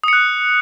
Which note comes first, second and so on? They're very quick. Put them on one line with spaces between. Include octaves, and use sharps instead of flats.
D#6 C#7 F#6